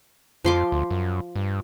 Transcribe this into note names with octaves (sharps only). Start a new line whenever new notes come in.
F2 F3 C6 D6
D2
F#2
G2